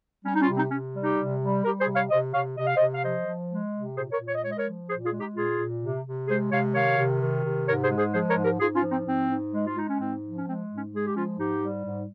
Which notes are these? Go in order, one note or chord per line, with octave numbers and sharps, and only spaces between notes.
G3 C#4
D#4
C#4 F4
C3
C4 D#4
C3 C#4
G3
D#4 G4
C3
G3
G3 G4 A#4
G#4 C5
C3
C#5 F5
C3 C5 D#5
C3 C#5 F5
C3 D#5
F5
C5 D#5
C3
F5
F3 C5 D#5
F3
G#3
C3
A#2 G#4 C5
A#4 C#5
A#2
C#5
D#5
G#3 C#5
D#5
A#4 C#5
F3
A#2 G#4 C5
F4 G#4
G#3
D#4 G4
A#2 F4 G#4
A#2
C3
C3
G#3 G#4 C5
C3 C#5 F5
D#3 C#5 F5
C3
D#3
C3
G#2 A#4 C#5
G#4 C5
G#3
G#4 C5
F3 G#4 C5
A#4 C#5
G#2
G4 A#4
G#2 F4 G#4
C#4 F4
F3
C4 D#4
G#2 C4
G#2
G#3
F4
G#3 D#4
C#4
G#2 C4
F3
C#4
G#3 C4
G#2
C#4
G#3 G#4
G4
F3 C#4 F4
G#2 D#4 G4
G3
G#2